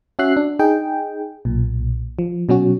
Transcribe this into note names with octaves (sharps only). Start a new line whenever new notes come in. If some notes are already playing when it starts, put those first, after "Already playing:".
C#4 F#4 E5 F#6 C7
D4
D#4 G#4 G5
B1 A#2
F3
B2 F#3 C#4 F#4